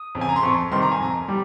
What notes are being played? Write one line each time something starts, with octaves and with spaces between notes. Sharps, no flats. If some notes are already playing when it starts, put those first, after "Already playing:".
Already playing: D#6
F2 C#3
G#5
A#5
C6
F2 C#6
C3 D#3 G3 C6
A#5
G#5
F2 A#5
G3